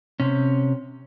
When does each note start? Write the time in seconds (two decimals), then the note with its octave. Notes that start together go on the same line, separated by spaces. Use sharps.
0.20 C3 C#4